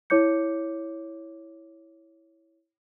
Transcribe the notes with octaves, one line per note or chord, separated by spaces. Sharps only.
E4 C#5 D6 G6 C#7